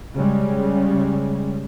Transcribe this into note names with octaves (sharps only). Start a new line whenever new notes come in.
C#3 G3 G#3 C#4